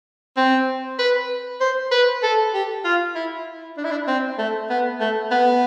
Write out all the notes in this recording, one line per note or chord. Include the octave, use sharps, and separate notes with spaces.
C4
B4
C5
B4
A4
G4
F4
E4
D4
E4
D4
C4
A3
B3
A3
B3